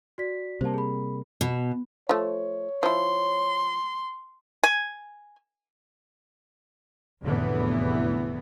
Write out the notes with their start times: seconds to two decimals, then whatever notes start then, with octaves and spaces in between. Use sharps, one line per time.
0.18 F#4 D5 B6
0.61 C3 G3 A#3 C5 A5
0.74 G#4 B5
1.41 B2
2.09 F3 A3 C#5
2.83 F3 E4 C6
4.64 G#5
7.22 F1 E2 A2 D3 E3 B3